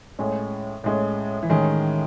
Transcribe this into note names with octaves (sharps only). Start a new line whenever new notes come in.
A2 G#3 C#4
A2 G#3 C#4
E3
A2 D#3 G#3 C#4